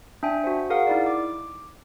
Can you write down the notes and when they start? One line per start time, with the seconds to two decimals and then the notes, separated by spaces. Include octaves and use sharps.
0.23 D4 E5 G5 G#5
0.44 F#4 C5
0.70 G#4 A#4 F5 F#5
0.87 D#4 E4 D5
1.06 D6